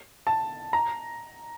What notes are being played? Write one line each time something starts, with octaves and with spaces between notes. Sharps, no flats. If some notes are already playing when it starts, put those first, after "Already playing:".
A5
A#5